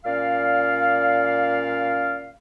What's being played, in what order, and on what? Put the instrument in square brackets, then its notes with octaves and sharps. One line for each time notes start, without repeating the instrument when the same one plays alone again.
[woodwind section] A#2 C#4 D5 F5